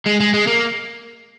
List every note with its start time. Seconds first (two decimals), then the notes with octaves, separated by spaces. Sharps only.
0.06 G#3
0.20 G#3
0.34 G#3
0.47 A#3